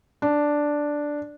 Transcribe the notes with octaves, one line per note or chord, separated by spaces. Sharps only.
D4